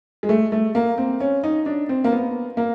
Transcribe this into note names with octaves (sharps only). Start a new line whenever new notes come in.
G#3
A3
A3
A#3
C4
C#4
D#4
D4
C4
A#3
B3
A#3